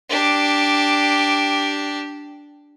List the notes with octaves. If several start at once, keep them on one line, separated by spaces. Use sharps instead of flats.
D4 G4